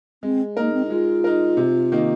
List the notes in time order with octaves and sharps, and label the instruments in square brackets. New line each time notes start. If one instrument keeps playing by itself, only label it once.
[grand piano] G#3 [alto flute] C4
[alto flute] A#3 [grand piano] D#4 A#4
[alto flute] C4
D#4
[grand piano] G#3 [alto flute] F4
[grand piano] D#4 A#4
C3
D#3 A#3 D#4